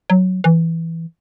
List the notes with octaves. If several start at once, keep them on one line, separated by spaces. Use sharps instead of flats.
F#3
E3